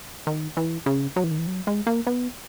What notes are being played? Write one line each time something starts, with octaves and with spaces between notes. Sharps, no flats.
D#3
E3
C#3
F#3
E3
D#3
E3
F#3
G#3
A#3
B3